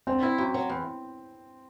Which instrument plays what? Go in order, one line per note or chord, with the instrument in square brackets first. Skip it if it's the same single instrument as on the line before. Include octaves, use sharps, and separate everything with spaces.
[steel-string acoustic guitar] D3 [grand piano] C4
[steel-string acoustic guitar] E4
F#2
F#3
E2